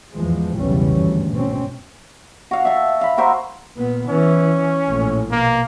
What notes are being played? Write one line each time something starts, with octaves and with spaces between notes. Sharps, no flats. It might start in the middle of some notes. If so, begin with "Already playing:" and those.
E2 G#2 E3 F3 G#3
B1 E2 C#3 E3 G3 C#4
G#1 D2 G2
B2 C4 C#4
F#4 F5
E5 A5
F5 B5
F#4 A#4 C5 E5
A#2 B3
E3 C#4
A#1 A2
B2 A#3